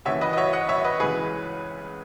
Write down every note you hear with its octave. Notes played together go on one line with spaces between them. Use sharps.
D#2 C#3 E3 C#5 E5
B4 D#5
D#5
C#5 E5
D#5 F#5
C#5 E5
B4 D#5
C#2 C#3 E3 G#4 B4